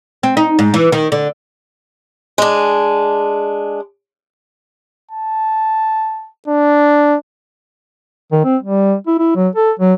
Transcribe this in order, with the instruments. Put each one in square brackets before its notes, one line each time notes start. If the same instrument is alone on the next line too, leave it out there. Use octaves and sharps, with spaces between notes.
[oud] C4
D#4
G#2
E3
D#3
D3
[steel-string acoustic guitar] G#3 D4
[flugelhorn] A5
D4
[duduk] D#3
C4
G3
E4
E4
F#3
A4
F#3